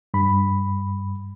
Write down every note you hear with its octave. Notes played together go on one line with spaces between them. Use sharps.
G2 B5